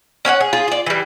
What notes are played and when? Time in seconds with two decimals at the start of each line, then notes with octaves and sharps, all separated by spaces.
0.25 C#4 C#5 F5 F#5
0.41 G#4
0.53 F4 G#4
0.68 F4 D5
0.86 E3 G3